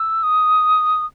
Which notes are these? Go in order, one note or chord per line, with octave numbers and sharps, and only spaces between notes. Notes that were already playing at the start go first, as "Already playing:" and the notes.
Already playing: E6
D#6